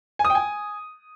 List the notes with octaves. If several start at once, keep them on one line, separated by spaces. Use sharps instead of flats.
G#5
D#6
G5
G#5